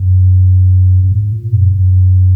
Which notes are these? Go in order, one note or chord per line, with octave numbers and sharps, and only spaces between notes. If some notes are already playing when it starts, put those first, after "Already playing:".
Already playing: F#2
F#2
G#2
A#2
F#2
F#2